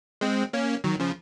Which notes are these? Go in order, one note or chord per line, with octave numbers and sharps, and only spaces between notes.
G#3 C4
A#3 C#4
D#3 F#3
C#3 F3